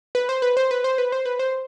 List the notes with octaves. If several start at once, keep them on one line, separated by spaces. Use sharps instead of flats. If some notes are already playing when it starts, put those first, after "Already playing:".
B4
C5
B4
C5
B4
C5
B4
C5
B4
C5